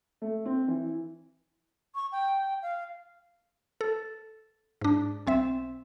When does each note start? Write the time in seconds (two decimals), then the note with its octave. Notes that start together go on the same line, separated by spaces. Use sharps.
0.22 A3
0.46 C4
0.68 E3
1.95 C#6
2.12 G5
2.62 F5
3.81 A4
4.81 G#2 D4
5.27 B1 C4 E5